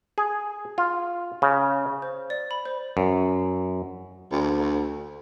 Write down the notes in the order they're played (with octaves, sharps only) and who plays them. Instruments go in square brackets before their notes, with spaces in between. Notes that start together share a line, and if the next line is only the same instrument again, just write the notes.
[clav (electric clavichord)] G#4
F4
C#3
[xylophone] C5
D5
B5
C5
[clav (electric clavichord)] F#2
[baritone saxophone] D2